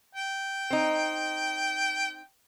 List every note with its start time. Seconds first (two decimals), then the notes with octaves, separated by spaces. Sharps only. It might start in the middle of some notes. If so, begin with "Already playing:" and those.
0.15 G5
0.70 C4 D#4